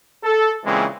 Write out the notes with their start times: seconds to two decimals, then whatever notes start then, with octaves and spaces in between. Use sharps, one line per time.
0.24 A4
0.65 A#2 C#3 E3 G#3 C4